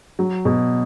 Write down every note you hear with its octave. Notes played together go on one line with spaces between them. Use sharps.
F#3
B2